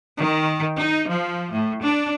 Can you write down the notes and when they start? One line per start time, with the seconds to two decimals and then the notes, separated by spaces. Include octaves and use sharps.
0.19 D#3
0.78 D#4
1.07 F3
1.53 A2
1.83 D4